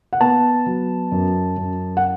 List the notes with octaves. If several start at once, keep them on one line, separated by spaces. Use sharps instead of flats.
F#5
B3 A5
F#3
F#2
F#2
F#5